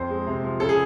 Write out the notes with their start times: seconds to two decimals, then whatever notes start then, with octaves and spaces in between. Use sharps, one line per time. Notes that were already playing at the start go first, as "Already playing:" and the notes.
Already playing: F2 C4 C5
0.10 G#3
0.27 C3
0.43 F3
0.60 C#3 A4
0.69 G#4